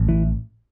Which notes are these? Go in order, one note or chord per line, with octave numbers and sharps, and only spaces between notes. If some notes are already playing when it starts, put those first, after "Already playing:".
Already playing: A1
E3